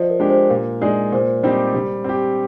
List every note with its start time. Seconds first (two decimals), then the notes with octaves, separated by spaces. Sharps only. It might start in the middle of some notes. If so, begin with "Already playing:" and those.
Already playing: F3 C5 D5 D#5
0.10 A#4
0.20 G#3 D4 G4
0.30 C5
0.50 A#2 A#4
0.81 G#3 D#4 G#4 D5
1.12 A#2 C5
1.43 G3 C4 D#4 G4
1.74 G3
2.04 C4 G4